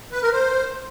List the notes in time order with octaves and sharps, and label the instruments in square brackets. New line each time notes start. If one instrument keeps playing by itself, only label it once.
[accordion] B4
A#4
C5